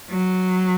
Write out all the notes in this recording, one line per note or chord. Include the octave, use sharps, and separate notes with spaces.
F#3